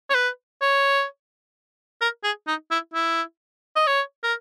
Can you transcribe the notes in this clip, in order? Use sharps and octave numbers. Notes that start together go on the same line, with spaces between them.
C#5
B4
C#5
A#4
G#4
D#4
E4
E4
D#5
C#5
A#4